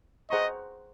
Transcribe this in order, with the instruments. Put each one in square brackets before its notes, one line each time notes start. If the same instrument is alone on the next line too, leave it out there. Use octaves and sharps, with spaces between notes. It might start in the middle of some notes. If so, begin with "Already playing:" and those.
[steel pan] G#4 C5 F#5 A#5 C#6 [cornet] D#5